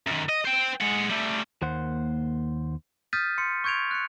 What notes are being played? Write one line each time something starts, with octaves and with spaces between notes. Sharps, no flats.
F#2 D#3
D#5
C5 G5
G#3 F#5
G3 A3
D#2 A#3 C5 F#5
D#6 F6 G6 A6 B6 D#7
C6 C#7
C#6 G6 G#6 D7 F7
F#6 C#7